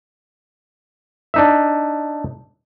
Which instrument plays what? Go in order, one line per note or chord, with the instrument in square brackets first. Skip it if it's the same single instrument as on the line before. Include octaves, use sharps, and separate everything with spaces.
[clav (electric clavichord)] D4 D#4 E5